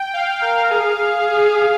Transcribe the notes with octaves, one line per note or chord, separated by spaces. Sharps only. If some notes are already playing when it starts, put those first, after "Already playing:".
Already playing: G5
F5
A#4 F5
G#4
G#4